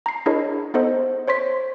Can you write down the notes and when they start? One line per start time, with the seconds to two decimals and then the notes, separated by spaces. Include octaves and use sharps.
0.06 A#5 C7
0.26 D4 E4 G#4 A#4 C#5 D#5
0.74 B3 D#4 A4 C5 D#5
1.28 C5 C#5 C6 B6